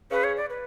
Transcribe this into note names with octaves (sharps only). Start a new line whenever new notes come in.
C#3 B4
C#5
D5
B4